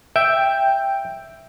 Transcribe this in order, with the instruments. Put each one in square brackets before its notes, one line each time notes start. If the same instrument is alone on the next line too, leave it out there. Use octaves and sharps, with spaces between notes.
[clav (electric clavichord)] E5 [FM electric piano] G5